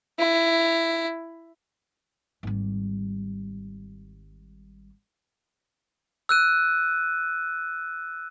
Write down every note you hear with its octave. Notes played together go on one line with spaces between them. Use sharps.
E4
G#1 G3
E6 F#6 D#7